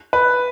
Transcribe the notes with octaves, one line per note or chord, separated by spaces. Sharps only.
B4